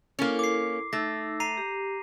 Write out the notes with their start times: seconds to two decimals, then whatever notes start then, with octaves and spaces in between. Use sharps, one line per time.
0.19 A#3 C#4 E4 A4 A#4
0.39 D6 C7
0.93 A3 D#4 E6 A#6
1.40 A#5 C7 D#7
1.57 G4